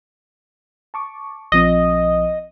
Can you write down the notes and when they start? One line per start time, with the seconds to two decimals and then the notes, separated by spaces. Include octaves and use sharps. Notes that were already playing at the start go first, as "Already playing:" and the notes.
0.94 A5 C#6 D6
1.52 A#1 F3 C4 D#5